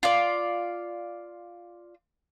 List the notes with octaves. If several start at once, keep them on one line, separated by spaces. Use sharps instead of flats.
F4 D5